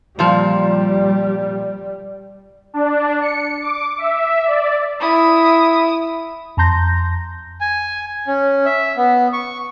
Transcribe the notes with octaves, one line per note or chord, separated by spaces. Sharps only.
A#2 F3 G3
D4
C#7
D6
E5
D5
E4 D#6
F2 A5 A#5 C6 G6 A#6
G#5
C#4
E5
B3
C#6